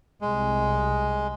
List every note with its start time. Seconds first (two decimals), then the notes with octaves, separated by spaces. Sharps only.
0.21 C2 G#3